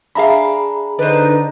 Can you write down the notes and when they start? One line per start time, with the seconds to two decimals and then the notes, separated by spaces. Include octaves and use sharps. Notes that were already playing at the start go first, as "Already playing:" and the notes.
0.15 D4 G#4 E5 F5 A#5 B5
0.99 D3 D#4 B4 C5 D5